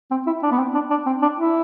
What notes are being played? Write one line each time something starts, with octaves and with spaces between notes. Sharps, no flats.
C4
E4
D4
B3
C4
D4
D4
C4
D4
E4